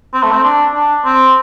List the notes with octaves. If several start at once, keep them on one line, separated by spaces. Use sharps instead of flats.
C4
A3
C4
D4
D4
C4